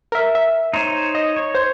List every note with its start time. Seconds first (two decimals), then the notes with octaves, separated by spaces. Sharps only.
0.12 A#4 E5
0.35 E5
0.73 D#4 C5 C#5
1.15 D#5
1.37 C#5
1.55 C5